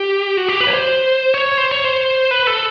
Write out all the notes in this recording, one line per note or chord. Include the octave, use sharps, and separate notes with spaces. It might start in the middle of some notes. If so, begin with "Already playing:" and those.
Already playing: G4
F#4
G4
B4
C#5
C5
C#5
C5
C#5
C5
B4
A4